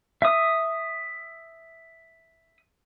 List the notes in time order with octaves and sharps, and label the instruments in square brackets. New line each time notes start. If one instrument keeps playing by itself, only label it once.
[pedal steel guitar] E5 D#6